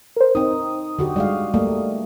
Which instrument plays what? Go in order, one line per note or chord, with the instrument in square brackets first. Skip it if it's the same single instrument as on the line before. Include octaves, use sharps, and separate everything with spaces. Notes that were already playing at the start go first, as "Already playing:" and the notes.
[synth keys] A#4 C5
[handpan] C4 D#4 [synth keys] D#6
[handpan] D3 F#4 G4
G3 G#3 F5
G3 A3 A#3